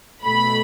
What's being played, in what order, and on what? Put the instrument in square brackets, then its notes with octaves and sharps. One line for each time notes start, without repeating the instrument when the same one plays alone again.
[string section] B2 A3 B5